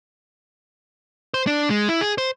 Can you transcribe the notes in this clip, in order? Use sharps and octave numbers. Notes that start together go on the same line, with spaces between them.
C5
D4
G#3
E4
G#4
C5